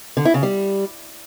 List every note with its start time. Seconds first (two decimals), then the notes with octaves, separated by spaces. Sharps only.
0.17 D3
0.25 E4
0.34 C#3
0.43 G3